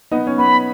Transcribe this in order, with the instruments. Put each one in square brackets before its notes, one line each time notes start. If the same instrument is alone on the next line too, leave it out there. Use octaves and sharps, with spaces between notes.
[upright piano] B3 D#4
C#4
[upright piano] B3 [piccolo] B5